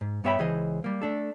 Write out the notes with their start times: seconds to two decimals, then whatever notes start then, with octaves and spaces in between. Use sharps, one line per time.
0.01 G#2
0.24 G2 B3 C#5 E5 G5 B5
0.39 C#2 E3 G#4 C5 D#5
0.84 G3 A#3
1.02 A3 D4 A4